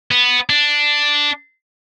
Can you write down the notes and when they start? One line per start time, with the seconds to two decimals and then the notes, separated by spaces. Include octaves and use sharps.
0.11 B3
0.50 D4